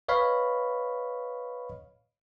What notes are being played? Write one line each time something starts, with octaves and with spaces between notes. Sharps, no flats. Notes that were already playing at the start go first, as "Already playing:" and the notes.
B4 C#5 D#5 F5 B5